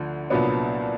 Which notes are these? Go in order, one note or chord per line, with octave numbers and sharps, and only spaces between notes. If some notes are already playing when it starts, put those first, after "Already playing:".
Already playing: D2 D3 F3
C2 A#2 F#3 B3 D4